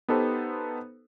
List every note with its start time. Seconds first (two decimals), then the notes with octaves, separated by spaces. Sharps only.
0.09 B3 D#4 G4 A4 B4 C5